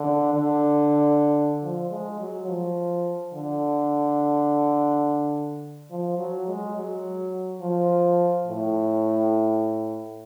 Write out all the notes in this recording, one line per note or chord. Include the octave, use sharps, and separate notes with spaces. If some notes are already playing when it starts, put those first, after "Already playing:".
Already playing: D3
D3
F3
G#3
F#3
F3
D3
F3
F#3
G#3
F#3
F3
A2